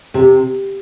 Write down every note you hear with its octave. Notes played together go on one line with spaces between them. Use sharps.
C3